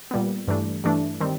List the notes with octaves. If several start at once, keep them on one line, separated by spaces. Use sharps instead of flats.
A#2 G3 B3
G2 E3 A3 D4
G2 E3 A3 D4
D#3 G3 C4